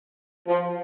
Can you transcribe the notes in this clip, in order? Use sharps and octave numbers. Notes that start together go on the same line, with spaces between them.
F3